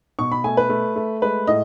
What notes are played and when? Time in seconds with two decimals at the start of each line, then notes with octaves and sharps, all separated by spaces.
0.19 B2 C#6
0.32 B5
0.44 A3 G#5
0.57 B4
0.69 A3
0.96 A3
1.22 G#3 B4
1.47 A2 D#5